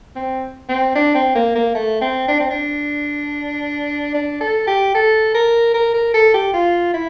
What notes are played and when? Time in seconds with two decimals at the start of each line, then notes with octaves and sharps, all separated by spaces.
0.16 C4
0.69 C4
0.95 D4
1.15 C4
1.35 A#3
1.55 A#3
1.75 A3
2.01 C4
2.28 D4
2.40 C4
2.50 D4
4.14 D4
4.41 A4
4.67 G4
4.95 A4
5.34 A#4
5.74 A#4
5.94 A#4
6.14 A4
6.34 G4
6.54 F4
6.94 E4